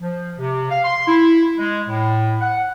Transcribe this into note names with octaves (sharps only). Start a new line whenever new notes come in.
F3
C3
F5
C6
E4
G#3
A2
F#5